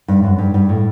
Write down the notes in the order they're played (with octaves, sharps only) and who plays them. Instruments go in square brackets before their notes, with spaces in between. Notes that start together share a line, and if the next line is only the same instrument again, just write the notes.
[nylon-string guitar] G2
F#2
G2
G2
A2